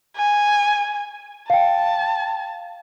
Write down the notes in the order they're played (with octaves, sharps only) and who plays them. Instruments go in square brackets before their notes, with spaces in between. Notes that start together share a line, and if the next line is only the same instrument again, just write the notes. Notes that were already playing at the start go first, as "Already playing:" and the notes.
[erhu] G#5
[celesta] F5 G5 [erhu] A5